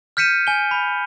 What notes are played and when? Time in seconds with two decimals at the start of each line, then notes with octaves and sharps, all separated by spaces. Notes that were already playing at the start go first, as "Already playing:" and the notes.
0.17 F6 G6 B6 C#7 D#7 E7
0.47 G#5 G7
0.71 B5